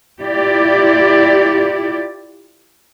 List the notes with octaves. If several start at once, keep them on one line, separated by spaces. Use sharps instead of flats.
E4 F4 G4 D5